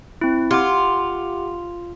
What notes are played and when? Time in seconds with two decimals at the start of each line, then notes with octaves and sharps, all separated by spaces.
0.21 C4 E4
0.51 F4 G4 F#5 D6